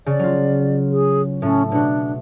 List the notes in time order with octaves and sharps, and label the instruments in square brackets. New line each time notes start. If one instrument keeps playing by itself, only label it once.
[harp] C#3 [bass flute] D5
[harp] F#3 F4
[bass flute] G#4
[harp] A2 A3 [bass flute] C#4
[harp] B2 F#4 [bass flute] D4